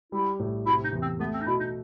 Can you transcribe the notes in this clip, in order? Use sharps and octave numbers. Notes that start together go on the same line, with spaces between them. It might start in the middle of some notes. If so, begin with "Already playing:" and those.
G3 E4
A2
C3 E4
D#4
E2
C4
A3 B3
C4
D#4
B2 E4
D#4